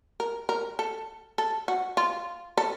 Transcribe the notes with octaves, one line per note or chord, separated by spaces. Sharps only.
A#4
A#4
A4
A4
F#4
F4
A4